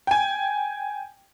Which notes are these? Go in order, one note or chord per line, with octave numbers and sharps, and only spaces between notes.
G5 G#5